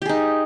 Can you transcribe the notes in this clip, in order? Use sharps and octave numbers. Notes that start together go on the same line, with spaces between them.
D#4 G4 G#4